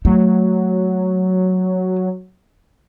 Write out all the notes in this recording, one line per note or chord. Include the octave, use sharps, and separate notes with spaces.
F#3 A3